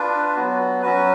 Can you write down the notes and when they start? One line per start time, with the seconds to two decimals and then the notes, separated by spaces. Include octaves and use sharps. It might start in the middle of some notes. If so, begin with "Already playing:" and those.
Already playing: D4 F4 B4
0.35 F#3 B3 F#4
0.82 F#3 C#4 F#4 B4